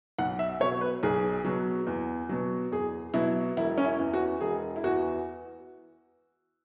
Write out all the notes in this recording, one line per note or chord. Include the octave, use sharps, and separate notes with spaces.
B1 F#5
E5
B2 F#3 C#5
B4
B1 G#4
B2 F#3
E2
B2 F#3
E2 G#4
B2 F#3 E4
E1 E4
C#4
E4
E2 E3
F#4
E1 G#4
E4
E2 E3 F#4